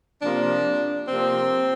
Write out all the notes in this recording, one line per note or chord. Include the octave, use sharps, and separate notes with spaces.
C3 F3 A#3 D4
C3 F3 A#3 C4